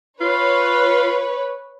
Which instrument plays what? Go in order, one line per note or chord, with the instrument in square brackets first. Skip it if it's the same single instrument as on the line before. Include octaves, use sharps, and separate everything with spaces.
[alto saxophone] F4 [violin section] B4 C#5